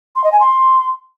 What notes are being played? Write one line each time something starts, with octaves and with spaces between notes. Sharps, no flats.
C6
D#5
G#5
C6